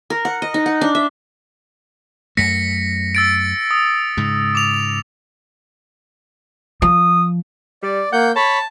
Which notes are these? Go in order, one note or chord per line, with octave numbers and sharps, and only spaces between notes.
A#4
F#5
D#5
D#4
F#5
D4
E5
F#2 A3 A#6 B6 C#7
E6 A6 D7
D#6
G#2 C#3
D6 F7
F3 D#6
G3 D5
A#3 F#5 G6
C#5 A5 B5